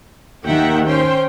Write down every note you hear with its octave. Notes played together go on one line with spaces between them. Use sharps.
D#2 D#3 A#3 E5 F#5 G5
C#4 C5 G5 C6